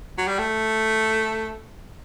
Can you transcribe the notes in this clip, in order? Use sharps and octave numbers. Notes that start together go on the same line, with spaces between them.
F#3
G3
A3